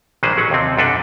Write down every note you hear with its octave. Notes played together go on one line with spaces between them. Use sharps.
A#1 D#3 E3 G#3 B4 C5
A1 F#3 C#4 F#5
D#2 C3 C4
B1 F#2 G3 D4 A4 B4